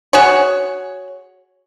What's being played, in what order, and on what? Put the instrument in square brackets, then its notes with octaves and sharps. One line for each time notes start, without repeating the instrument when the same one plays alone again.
[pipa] F#4 G#4 C#5